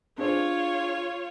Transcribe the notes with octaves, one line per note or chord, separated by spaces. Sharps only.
D4 F4 G#4 C5 C#5